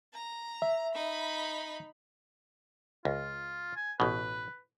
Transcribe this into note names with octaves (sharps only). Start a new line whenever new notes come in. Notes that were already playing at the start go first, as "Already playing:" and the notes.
A#5
E5
D#4 B5
C#2 F4
G#5
A1 B2 B4